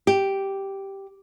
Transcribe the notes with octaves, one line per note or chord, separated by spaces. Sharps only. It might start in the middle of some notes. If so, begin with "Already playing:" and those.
G4